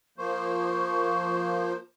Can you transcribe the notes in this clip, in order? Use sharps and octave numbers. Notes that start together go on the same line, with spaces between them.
F3 A#3 C5 C#6